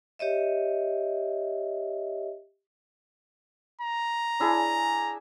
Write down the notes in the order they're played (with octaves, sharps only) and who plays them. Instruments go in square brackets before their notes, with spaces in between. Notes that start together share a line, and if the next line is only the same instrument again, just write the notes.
[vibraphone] G4 C#5 D#5 E5
[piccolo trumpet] A#5
[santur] D4 E4 G#4